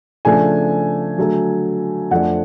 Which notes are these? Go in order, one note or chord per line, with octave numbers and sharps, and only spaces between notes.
C#3 F3 A3 D4 G#5
D3 F#3 A3
F2 F3 A3 D4 F#5